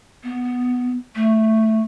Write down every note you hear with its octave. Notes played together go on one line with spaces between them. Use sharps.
B3
A3